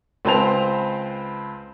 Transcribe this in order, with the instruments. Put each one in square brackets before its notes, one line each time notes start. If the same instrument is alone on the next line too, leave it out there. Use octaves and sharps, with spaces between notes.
[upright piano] C#2 C4 B4 C5 A5 F7